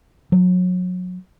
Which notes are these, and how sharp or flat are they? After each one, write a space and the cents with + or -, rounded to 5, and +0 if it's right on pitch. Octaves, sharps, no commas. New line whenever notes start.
F#3 -30